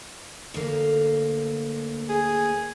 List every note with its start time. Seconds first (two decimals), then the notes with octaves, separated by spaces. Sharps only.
0.54 D2 A#3
2.09 G#4